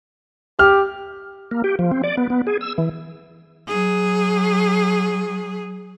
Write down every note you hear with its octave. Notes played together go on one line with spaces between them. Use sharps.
G4 F6
A#3
G4
F3
C4
D5
B3
B3
G#4
E6
E3
F#3 G#4